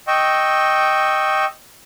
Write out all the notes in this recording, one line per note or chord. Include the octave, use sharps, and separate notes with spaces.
D#5 G5 C#6 E6